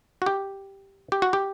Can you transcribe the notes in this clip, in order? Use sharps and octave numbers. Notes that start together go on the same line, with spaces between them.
F#4
G4
G4
F#4
G4